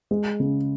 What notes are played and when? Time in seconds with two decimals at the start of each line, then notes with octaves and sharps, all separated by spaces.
0.11 G#3
0.40 C#3